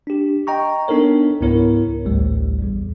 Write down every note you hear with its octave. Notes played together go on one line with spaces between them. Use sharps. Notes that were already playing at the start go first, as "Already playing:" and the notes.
D4 G4
D#5 G5 A#5 C#6
B3 D4 D#4 A4 A#4 C#5
C#2 G#2 B3 E4 A#4 C#5
A1 D2 A2 G3
A#1 E2